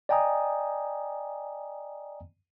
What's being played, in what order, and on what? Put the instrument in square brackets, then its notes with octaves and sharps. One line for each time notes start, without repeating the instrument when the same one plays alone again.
[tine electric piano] D5 D#5 G5 G#5 A#5 D#6